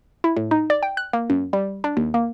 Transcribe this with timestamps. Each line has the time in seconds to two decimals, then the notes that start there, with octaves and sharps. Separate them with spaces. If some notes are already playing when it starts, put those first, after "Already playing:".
0.24 E4
0.37 A2
0.51 D#4
0.70 D5
0.83 G5
0.97 F#6
1.13 A#3
1.30 F#2
1.53 G3
1.84 D4
1.97 D#2
2.14 A#3